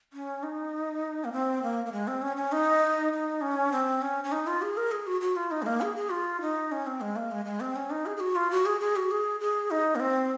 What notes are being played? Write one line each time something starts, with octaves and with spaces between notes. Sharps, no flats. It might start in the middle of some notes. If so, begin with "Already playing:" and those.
C#4
D#4
A#3
C4
A#3
A#3
G#3
C4
C#4
C#4
D#4
D#4
C#4
C4
C#4
C#4
D#4
F4
G#4
A#4
G#4
F#4
F#4
F4
D#4
G#3
A#3
G#4
G#4
F4
D#4
C#4
C4
G#3
A#3
G#3
G#3
C4
C#4
D#4
G#4
G#4
F#4
F4
F#4
G#4
G#4
F#4
G#4
G#4
D#4
A#3
C4